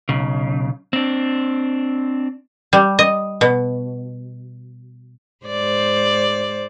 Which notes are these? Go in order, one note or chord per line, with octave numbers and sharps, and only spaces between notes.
B1 C#3
C4 D4
G3
D#5
B2
G#2 C5 D5